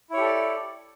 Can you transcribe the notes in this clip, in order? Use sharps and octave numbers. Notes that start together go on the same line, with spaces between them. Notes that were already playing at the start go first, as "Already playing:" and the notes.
E4 G4 A4 C#5 D5